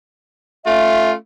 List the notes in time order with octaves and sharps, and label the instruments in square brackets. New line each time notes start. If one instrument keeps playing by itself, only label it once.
[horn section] A3 C#4 F4 [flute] E5